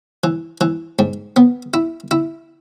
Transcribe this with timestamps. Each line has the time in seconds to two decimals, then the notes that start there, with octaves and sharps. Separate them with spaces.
0.24 E3
0.61 E3
0.99 G#2
1.36 B3
1.74 E4
2.11 E4